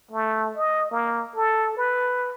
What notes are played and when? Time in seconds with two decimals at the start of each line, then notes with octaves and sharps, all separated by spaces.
0.11 A3
0.56 D#5
0.91 A#3
1.36 A4
1.77 B4